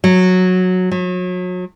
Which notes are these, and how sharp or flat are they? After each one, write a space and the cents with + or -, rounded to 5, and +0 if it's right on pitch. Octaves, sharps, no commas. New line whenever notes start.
F#3 -10
F#3 -35